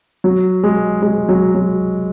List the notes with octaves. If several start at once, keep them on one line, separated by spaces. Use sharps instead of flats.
F#3
G#3
G#3
F#3
F#3